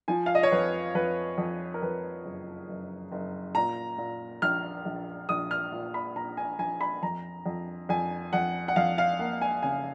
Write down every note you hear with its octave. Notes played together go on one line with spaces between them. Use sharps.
F3 G#5
F5
D#5
C#5
F2 B4
F2 B4
F2
A#4
F2 B4
F#1
F#1
F#1
A#2 A#5
A#2
A#1 F6
A#1
A#1 D#6
F6
A#2
B5
A#2 A#5
G#5
A#1 G#5
B5
F2 A#5
F2
F2 G#5
F2 F#5
F#5
F2 F5
F5
A#3 F#5
G#5
C#3 G#5